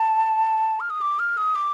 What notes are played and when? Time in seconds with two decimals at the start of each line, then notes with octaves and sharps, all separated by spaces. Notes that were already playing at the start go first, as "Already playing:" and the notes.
Already playing: A5
0.80 F6
0.90 D#6
1.01 D6
1.19 F6
1.37 D#6
1.55 D6